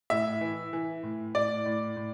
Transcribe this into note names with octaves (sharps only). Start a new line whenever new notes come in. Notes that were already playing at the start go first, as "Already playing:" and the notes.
A2 E5
E3
E3
A2
A2 D5
A2
A2